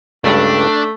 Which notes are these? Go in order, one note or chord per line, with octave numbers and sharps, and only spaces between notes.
C#2 G2 A3 D4